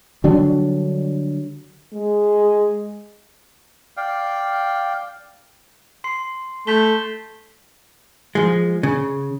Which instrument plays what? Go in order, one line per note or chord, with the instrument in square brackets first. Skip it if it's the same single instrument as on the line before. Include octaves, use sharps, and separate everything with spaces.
[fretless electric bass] D3 F#3 G3 D4
[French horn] G#3
[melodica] D5 F5 G5
[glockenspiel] C6 C7
[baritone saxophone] A3 [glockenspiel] G6 B6 G7
[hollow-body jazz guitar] F3 G#3
C#3